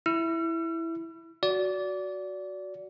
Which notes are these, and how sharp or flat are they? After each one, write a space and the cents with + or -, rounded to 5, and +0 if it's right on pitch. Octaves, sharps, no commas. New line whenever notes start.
E4 +0 E6 +45
F#4 +0 D5 -25